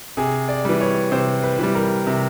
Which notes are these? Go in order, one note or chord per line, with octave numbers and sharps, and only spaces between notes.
C3 G#4
D5
E3 G3
C#5
C3 C5
B4
E3 G3
A#4
C3